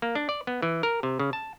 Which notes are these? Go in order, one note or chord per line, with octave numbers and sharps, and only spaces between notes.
A#3
D4
D5
B3
E3
A#4
C3
C#3
A5